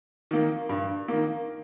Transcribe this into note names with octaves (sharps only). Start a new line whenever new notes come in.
D#3 A#3
G2
D#3 A#3